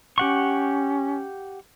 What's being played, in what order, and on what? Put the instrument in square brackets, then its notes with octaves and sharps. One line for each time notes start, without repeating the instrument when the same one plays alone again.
[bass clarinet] C#4 [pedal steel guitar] G4 F#5 C#6